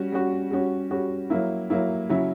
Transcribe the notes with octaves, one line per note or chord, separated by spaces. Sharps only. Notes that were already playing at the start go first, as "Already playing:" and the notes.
Already playing: G3 C#4 F#4
G3 C#4 F#4
G3 C#4 F#4
G3 C#4 F#4
F#3 A#3 E4
F#3 A#3 E4
C#3 F#3 C#4 E4